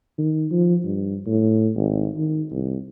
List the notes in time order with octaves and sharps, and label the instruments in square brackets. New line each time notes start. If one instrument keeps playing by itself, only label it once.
[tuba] D#3
F3
G2
A2
G#1
D#3
C2